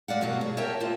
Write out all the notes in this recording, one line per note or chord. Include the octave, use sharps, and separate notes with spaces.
G#3 D5 F5 F#5
G2 B2 F#3 A#3 F#4
G#4
A#4 C#5 E5 G5 A5
A#3 F4 C5